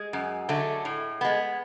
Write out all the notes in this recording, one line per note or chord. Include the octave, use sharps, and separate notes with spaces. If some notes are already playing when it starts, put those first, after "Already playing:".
Already playing: G#3 G#4
F#2
D3 F#3 A3
A2
G#3 B3